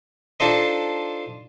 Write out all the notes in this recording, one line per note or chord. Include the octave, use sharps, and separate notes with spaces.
D4 D#4 F4 A4 C5 D#5